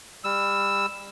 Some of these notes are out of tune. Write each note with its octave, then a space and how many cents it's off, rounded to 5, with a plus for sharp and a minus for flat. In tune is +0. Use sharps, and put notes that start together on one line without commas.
G3 +25 E6 +0